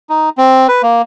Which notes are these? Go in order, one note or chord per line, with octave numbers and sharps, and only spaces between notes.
D#4
C4
B4
A#3